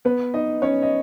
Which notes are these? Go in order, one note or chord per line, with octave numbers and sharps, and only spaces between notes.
B3 B4
D#4 D#5
C#4 C#5
D#5